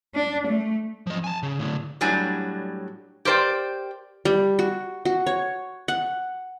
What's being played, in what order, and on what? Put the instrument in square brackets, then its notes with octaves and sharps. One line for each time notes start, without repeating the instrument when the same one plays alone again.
[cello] D4
A3
[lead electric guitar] F3 D#5
G#5 A5
C#3
A2 D3
[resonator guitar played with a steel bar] A2 F#3 G3 D4 G#5
G4 A#4 C5 D5 G5
[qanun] G3
F#4
F#4
C#5
F#5